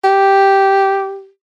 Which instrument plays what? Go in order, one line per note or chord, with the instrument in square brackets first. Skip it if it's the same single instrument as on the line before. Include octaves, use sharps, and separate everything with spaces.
[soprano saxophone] G4